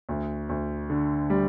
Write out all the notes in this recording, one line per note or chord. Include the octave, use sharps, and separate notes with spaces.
D2
D2
D3
G3